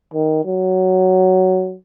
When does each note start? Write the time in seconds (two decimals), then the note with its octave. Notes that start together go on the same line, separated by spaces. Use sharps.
0.14 D#3
0.45 F#3